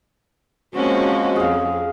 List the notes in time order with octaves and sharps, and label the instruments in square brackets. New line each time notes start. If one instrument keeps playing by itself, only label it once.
[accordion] F3 G#3 F#4 [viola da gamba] A#3 C4 C#4
[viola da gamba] F2 [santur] G#4 F5